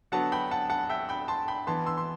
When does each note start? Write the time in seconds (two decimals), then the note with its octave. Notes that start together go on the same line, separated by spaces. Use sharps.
0.12 D3 F#3 B3 F#5 A5
0.32 G5 B5
0.51 F#5 A5
0.70 F#5 A5
0.90 E5 G5
1.09 G5 B5
1.28 A5 C6
1.48 G5 B5
1.67 E3 B3 A5 C6
1.86 C6 E6
1.98 C6